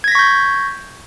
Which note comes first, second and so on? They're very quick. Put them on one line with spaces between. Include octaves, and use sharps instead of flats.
G#6 A#6 B6 C#6 G6